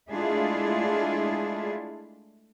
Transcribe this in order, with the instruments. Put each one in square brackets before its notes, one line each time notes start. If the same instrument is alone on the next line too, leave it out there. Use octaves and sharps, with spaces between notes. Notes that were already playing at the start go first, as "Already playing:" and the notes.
[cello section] G#3 A3 D4 E4 F4 G#4